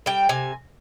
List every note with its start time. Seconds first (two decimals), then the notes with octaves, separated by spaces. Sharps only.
0.06 G3 G5
0.29 C3 G#5